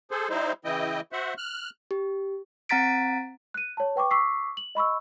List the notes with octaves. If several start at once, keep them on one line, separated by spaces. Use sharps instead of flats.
G#4 A4 C5
G3 D#4 E4 C5
C#3 E3 E4 D#5 G5
F#4 C5 E5 F#5
F6 F#6
G4
C4 F#5 A#5 A6 B6 D7
F#6 D#7
C#5 A5
B4 G5 C#6 D6
C#6 D6 E6 B6 C7
F#7
D#5 B5 C#6 E6